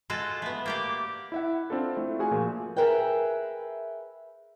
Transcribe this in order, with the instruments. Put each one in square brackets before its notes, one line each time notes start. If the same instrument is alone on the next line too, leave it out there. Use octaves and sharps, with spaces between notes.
[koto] G#3 F4 F#4 A4
A3 B3
A#3 G4 D5
[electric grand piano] E4 E5 F#5
C4 D4 F4 A4
A3 E4
F4 F#4 G#4 G#5
A#2 F3
[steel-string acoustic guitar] G#4 A#4 B4 E5 G5